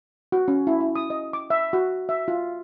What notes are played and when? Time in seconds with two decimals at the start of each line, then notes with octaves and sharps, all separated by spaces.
0.32 F#4
0.48 C#4
0.67 E4
0.80 E4
0.96 D#6
1.10 D#5
1.33 D6
1.50 E5
1.73 F#4
2.09 E5
2.28 F4